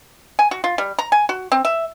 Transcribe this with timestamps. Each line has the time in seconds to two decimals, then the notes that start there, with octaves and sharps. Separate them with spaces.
0.39 G#5
0.51 F#4
0.64 F4
0.78 G3
0.99 A#5
1.12 G#5
1.29 F#4
1.52 C4
1.65 E5